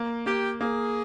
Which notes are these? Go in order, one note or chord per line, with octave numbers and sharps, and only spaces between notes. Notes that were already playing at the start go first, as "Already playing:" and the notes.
Already playing: A#3
A#3 G4
A#3 G#4